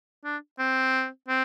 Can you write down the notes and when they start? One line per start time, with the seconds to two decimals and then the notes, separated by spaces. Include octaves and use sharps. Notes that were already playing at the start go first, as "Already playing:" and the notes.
0.25 D4
0.59 C4
1.28 C4